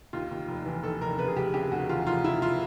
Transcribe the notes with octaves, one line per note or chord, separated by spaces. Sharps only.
D#2 F4
D#2
F1
E3
D#2 A4
F1 A#4
C#3 B4
G#4
F1 G4
C#3 G4
D#2 F#4
E3 F4
F1 F4
F1 E4
F4